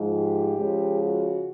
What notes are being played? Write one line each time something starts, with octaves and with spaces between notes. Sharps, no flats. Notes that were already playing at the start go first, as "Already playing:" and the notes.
Already playing: G#2 F3 G#3
G4
C#3 F3 G#3
F#4